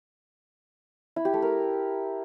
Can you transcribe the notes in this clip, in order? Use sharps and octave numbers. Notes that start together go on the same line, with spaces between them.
E4
G4
A3
A#4